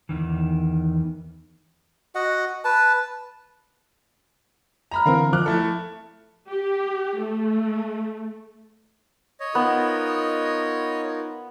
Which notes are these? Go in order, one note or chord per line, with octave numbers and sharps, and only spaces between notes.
E2 G#2 D#3 E3
F#4 D#5 F#5
B4 A5
A#5 B5 F6
D3 E3 C4 A#4 F5
F3 D6 F6 F#6
A3 E4 A4
G4
A3
C#5 D#5
B3 D#4 F4 A#4